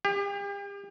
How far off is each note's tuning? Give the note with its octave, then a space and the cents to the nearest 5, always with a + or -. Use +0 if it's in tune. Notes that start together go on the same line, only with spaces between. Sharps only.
G4 +40